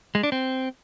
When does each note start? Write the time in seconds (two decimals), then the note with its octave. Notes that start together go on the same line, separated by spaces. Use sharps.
0.15 G#3
0.23 D4
0.32 C4